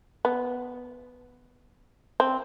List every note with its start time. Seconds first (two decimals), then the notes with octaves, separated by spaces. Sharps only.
0.25 B3
2.20 C4